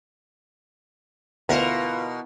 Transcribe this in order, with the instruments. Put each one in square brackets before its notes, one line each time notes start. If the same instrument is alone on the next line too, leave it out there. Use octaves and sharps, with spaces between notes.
[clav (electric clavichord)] D2 [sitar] B2 A#4 [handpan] B3 E4 [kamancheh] F4 B4